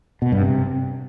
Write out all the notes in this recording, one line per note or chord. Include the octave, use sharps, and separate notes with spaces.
B2
G2
C3